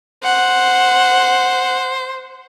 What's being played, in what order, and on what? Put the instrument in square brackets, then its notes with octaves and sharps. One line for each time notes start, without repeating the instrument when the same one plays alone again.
[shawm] C5 [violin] F#5